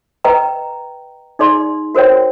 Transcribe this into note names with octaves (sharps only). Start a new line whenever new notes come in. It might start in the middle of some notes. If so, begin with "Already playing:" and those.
B4 D#5 G5 A#5
D#4 G#4 D5 C6
F#4 A#4 C5 C#5 G5